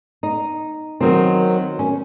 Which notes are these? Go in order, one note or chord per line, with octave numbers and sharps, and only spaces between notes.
D#4
D#3 F#3 C4
C#4